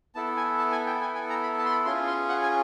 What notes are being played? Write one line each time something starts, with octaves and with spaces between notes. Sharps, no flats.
B3 E4 A4 A5
G#5
A5
G#5
G5
G#5
G#5
A#5
B5
A5
C6
B5
C#4 F4 G#4 C6
C6
F#5
G#5